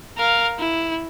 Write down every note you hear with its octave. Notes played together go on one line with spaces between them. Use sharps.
A#4 F5
E4